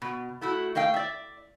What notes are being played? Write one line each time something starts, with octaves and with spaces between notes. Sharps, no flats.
B2
A3 E4 F#4
A3 D#5 F5 G5
D5 E5